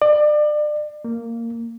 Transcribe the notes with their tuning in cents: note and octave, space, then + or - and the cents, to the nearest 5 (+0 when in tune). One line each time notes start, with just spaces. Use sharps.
D5 +30
A#3 -15